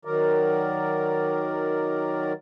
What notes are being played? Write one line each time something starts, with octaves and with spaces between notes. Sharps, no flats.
D#3 F#3 A#4 D5